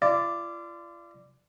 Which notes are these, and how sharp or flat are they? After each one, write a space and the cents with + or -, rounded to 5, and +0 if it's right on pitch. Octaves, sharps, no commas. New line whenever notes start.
F4 -40 D5 +0